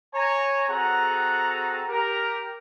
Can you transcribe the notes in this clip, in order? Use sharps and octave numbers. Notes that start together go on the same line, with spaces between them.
C#5 G#5 A#5
C4 F#4 G#4 A4 F#5 A#5
G4 A#4